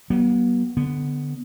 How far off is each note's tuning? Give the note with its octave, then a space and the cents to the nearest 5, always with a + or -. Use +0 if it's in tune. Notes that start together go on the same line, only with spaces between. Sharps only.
F#3 +40 B3 -45
D3 +0 B3 +0